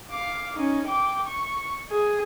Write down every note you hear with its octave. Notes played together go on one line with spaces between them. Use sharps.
F5 D6
C#4 D#4
G5 D6
C#6
G#4